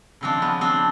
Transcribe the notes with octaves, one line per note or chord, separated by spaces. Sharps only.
C#3 F3 G#3 C4 D4
B3 C#4
C4 D4